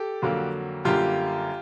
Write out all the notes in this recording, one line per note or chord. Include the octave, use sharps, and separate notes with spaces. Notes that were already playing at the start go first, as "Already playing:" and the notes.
Already playing: G4 A4
F2 D3 F#3 A#3
F#2 D3 G3 A#3 F4 G4